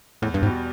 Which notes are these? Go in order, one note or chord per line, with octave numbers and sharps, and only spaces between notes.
E2 A2
G2
G#2 B2 G3